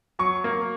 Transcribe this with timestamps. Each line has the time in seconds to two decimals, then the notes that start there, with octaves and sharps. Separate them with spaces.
0.19 F#3 C#6
0.44 A#3